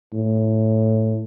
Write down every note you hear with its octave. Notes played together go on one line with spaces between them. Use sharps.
A2